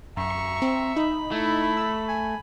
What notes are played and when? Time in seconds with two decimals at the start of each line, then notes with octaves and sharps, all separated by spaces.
0.17 F#2 E5 A#5 C#6
0.62 C4
0.96 D#4 B5
1.31 A3 E4
1.77 E6
2.08 G#5